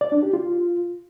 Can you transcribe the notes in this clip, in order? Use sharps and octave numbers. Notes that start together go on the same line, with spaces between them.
D5
D4
G4
F4